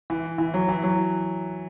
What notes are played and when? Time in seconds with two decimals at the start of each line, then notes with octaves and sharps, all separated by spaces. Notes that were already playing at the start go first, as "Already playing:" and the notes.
0.10 E3
0.38 E3
0.54 F#3
0.69 E3
0.83 F#3